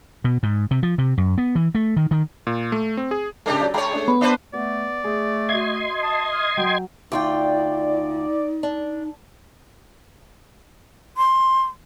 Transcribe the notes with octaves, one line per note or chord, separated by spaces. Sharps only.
B2
G#2
C3
F3
C3
F#2
B3
E3
A3
D#3
D#3
A#2
A3
C4
G#4
C#3 G#3 D4 G4 A#4
F#3 D5
G#3 C#5 G5 A#5 B5
A3 D4 G#4
B3
D4 B4 C5 E5 B5
A3 B3 D5
A3 G#4
F#4 D#5 E5 C6 G#6
A5 D#6
F6
F#3 G5
D2 D#4 F4 D5 G5
D4
C6